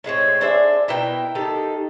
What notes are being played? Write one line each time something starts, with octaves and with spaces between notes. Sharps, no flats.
A2 G#3 C4 C#5
D4 G#4 C5 E5
B2 E4 A#4 G5
D#3 D#4 G4 A4